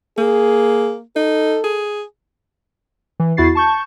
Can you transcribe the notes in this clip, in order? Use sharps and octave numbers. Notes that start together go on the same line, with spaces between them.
A#3 G#4
D#4 A4
G#4
E3
E2 E4 F#4 A6 C7
A5 C#6 G6